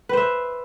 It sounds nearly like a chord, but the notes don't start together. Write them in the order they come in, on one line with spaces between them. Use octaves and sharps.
B4 C5 E5